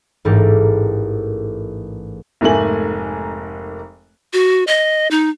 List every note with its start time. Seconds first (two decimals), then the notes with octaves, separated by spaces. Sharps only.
0.25 A1 G#2 A3 G4 A#4
2.41 F1 G#2 A3 A#3 G#5 F#7
4.33 F#4
4.67 D#5
5.11 D#4